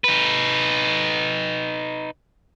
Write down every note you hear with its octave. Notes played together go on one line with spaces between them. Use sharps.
D#4 B4